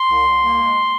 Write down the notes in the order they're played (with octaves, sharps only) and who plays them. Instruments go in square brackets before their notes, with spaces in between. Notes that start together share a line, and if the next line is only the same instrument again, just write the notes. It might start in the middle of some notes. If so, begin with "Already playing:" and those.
Already playing: [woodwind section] C6
C2
C2
A#3
G#3